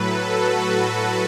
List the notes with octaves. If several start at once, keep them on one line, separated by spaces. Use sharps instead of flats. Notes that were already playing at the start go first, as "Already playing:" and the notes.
Already playing: A2 F#3 A4 B4
F#4